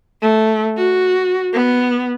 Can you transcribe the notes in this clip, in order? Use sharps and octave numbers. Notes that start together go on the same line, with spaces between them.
A3
F#4
B3